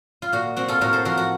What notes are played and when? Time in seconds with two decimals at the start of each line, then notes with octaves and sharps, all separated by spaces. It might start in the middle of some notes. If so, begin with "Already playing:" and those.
0.22 F4
0.32 A#2 F#4
0.57 C4 F#4
0.68 F4 A4
0.81 A2 F#4 A#4
0.93 A4 C5
1.05 F3 F#4 A#4
1.17 F#4